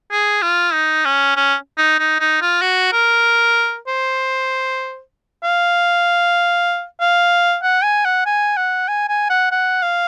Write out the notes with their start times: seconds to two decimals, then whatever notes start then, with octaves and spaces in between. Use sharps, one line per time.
0.11 G#4
0.42 F4
0.73 D#4
1.05 C#4
1.36 C#4
1.78 D#4
1.99 D#4
2.20 D#4
2.41 F4
2.62 F#4
2.93 A#4
3.87 C5
5.43 F5
7.00 F5
7.63 F#5
7.83 G#5
8.05 F#5
8.26 G#5
8.57 F#5
8.88 G#5
9.09 G#5
9.30 F#5
9.51 F#5
9.82 F5